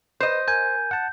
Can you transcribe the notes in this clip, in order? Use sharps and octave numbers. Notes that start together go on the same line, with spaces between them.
B4 C5 D#5 G6
A#4 G#5 G6
F#5 A5